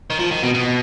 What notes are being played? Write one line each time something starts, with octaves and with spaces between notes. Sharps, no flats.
D#3
F3
D#3
B2
B2